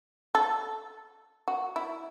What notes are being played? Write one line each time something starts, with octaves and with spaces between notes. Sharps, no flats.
A4
F#4
E4